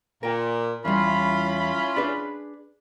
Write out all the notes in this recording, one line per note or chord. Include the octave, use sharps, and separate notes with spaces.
A#2 A#4 G5
E2 G3 C#4 E4 F4 B5
D4 G#4 B4